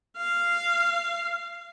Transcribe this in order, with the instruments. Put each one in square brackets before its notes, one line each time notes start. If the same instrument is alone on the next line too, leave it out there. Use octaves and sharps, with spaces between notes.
[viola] F5